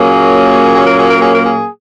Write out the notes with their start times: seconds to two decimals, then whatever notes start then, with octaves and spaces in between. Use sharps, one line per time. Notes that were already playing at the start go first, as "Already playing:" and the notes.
Already playing: A#2 F#3 A#3 C#4 G#4
0.76 G#4
0.87 A#4
0.98 G#4
1.11 A#4
1.22 G#4
1.35 A#4
1.46 G#4